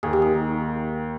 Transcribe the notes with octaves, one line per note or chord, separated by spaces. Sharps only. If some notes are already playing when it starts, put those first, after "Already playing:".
D#2 G#4
G4
D#3 G#4
D#3